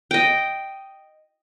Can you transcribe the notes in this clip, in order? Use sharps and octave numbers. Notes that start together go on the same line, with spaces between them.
D#5 G5